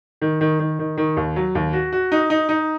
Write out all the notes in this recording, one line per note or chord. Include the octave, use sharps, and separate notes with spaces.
D#3
D#3
D#3
D#3
D#3
D#2
F#3
D#2
F#4
F#4
D#4
D#4
D#4